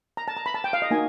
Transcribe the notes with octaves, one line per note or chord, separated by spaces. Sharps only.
A#5
A5
A#5
B5
A5
G5
F5
D#5
A#3 D#4 F#4 G#5